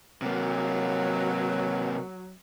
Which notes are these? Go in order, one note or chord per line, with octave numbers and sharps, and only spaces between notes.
C3 F#3 A#3